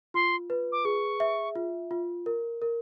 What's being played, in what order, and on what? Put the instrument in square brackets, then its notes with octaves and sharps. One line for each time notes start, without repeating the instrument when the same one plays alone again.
[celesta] F4 [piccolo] C6
[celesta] B4
[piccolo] D6
[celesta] G#4 [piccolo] C#6
[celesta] E5
F4
F4
A#4
A#4